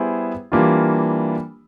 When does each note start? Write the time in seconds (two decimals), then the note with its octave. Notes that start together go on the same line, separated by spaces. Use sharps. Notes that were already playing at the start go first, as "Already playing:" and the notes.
Already playing: G3 B3 E4 G#4 C5
0.52 E3 G3 A#3 D4 F4